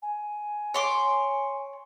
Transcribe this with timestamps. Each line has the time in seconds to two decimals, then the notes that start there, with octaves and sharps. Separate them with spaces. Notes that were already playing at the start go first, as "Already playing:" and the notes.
0.02 G#5
0.74 C#5 C6 D6